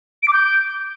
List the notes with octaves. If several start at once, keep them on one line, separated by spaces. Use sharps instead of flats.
D7
D6
G6